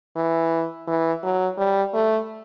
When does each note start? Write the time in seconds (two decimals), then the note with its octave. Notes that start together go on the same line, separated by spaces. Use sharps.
0.16 E3
0.87 E3
1.23 F#3
1.58 G3
1.94 A3